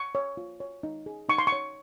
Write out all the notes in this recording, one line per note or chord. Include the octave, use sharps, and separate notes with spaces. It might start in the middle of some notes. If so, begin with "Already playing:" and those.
Already playing: C#6
C#5
F4
C#5
D#4
G#4
D#4 C#6
C6
C#6
C#5